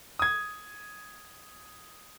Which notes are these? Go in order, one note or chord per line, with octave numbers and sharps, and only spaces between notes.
D#6 G#6